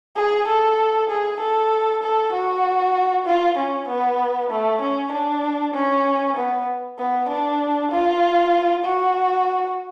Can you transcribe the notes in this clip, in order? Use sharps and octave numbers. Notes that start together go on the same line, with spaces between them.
G#4
A4
G#4
A4
A4
F#4
F4
C#4
B3
A3
C#4
D4
C#4
B3
B3
D4
F4
F#4